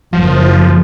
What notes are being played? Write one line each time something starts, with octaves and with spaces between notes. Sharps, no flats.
F#1 F3